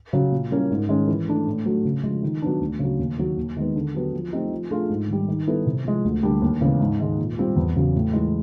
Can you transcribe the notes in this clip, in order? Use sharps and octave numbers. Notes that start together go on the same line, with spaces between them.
C#3 F#3
A#2
G3 A#3 C#4 E4
G#2
D#3 G#3 C#4
E3
A3 D4
A2
F#3 A3
C#3
F3 G#3
D#3
F#3 B3 D4
D2
C#3 F#3
D#2
D#3 F#3
D#2
D#3 G#3 B3
D3
F#3 B3 D4 G4
F3
A3 C4 D#4 G4
F3
A3 D4 F4 G#4
G#2
D#3 G3
D#3
G3 B3 E4 A4
C3
F3 G#3
D2
D3 G3 A#3 D4
D#2
C#3 E3 G#3 B3
G#2
D#3 G#3
A#2
G3 C4 F4
E2
C#3 F#3
A2
E3 G#3